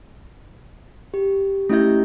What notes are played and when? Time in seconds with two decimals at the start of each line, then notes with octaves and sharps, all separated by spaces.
1.14 G4
1.69 A3 C#4 E4 G4 E5 G6